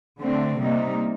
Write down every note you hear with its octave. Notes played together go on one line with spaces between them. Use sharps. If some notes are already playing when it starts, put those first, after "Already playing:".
D3 A3 C4
C3 G3 A#3 D#4